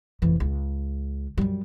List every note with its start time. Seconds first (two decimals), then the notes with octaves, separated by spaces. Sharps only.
0.22 F1 E3
0.40 C#2
1.38 F#2 G3